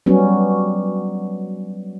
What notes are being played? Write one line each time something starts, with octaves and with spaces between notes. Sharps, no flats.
F#3 G3 B3 C#4